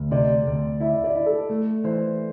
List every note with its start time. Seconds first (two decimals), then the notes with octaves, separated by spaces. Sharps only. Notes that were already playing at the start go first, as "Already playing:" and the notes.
Already playing: D2
0.11 C3 D5
0.47 D2
0.80 E4 E5
1.04 D5
1.15 E4
1.26 A4
1.50 A3
1.84 E3 C5